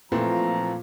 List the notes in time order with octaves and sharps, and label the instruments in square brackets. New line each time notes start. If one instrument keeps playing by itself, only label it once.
[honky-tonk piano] A#2 [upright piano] E3 A3 C4 [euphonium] F3 [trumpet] A#5